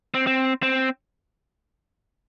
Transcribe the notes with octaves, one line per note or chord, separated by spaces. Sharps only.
C4
C4
C4